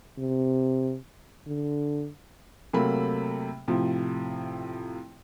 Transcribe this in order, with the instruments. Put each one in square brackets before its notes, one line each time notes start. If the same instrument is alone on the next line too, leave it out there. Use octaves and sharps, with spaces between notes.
[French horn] C3
D3
[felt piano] C3 F#3 A3 A#3 B5
A2 C3 F3